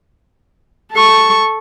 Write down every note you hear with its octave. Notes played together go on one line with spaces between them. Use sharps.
A4 C#6